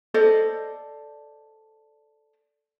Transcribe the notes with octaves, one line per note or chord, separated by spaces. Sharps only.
A4 C5 D5 D#5